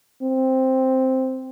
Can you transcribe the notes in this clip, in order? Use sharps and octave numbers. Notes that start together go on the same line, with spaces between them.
C4